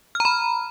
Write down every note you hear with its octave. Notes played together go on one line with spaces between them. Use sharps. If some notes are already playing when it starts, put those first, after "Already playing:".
F6
A#5
B5